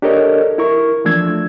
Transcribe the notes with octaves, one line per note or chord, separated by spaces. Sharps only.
D4 G4 A4 A#4 C#5 D#5
E4 A#4 C#6
E3 F3 A3 D4 E6 G#6